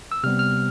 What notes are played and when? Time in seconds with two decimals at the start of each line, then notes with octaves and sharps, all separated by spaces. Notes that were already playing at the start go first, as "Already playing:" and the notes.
0.12 E6
0.24 C3 G3 B3 F6
0.39 F6